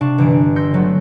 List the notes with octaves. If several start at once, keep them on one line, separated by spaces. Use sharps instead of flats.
C3 D4 F5 C#6 E7
G1 E3 D7
D4
C6 E6 G6 A#6 C#7
D3 F#3 A3 B3